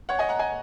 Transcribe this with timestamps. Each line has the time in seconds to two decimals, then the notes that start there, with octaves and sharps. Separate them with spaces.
0.09 C#5 F#5
0.19 D#5 G#5
0.29 F#5 A#5
0.39 D#5 G#5